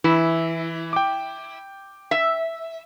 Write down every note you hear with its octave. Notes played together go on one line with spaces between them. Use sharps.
E3 E4
G5 D6
E5